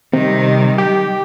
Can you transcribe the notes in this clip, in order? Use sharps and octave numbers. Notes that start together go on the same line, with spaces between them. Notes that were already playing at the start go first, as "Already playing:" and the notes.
C3 D#3 G3
G4